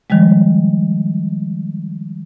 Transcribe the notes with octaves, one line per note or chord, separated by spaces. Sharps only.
D#3 F3 G3 G#3